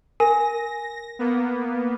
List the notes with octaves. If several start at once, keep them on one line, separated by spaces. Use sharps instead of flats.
A#4 G#5 A#6
A#3 B3